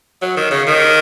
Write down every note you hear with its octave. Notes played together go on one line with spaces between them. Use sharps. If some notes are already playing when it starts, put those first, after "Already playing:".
F#3
D#3
C#3
D#3